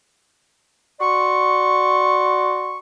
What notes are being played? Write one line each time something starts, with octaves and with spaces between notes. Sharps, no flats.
F#4 D5 C6 C#6